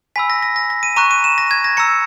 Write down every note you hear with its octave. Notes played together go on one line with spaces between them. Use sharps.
G#5 B5 E6 B6
A#6
A#6
A#6
A#6
D#7
A#5 C#6 F#6 D#7
D#7
E7
A#6
G#6
A#6
A#5 E6 C#7